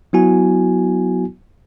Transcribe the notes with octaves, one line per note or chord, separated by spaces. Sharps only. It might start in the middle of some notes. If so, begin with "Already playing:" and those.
F#3 B3 E4 F#4 G#5